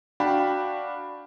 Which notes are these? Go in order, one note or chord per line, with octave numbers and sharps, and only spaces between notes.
D4 F#4 F5 G5 B5